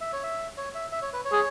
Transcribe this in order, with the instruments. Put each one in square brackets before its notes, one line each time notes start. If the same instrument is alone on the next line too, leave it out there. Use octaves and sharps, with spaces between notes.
[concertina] E5
C#5
E5
C#5
E5
E5
C#5
B4
C#5
[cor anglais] G#4